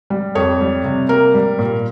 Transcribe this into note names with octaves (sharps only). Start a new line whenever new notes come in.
G3
F2 C#5
G3
C3
A#3 A#4
G3
A#2